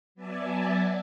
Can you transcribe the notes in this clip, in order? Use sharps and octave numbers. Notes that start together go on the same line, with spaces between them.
F#3 B3 D5 E5 G#5 A5